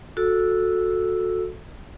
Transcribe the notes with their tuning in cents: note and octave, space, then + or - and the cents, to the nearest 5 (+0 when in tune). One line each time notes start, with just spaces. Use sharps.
F#4 -20 A4 +0 E6 +0